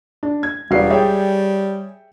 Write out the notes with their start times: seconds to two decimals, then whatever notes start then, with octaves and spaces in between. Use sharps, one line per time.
0.23 D4
0.43 G#6
0.71 E1 G3 F4 F#4 B4 D5 C7
0.90 G#4 C#5 D5 E5 G5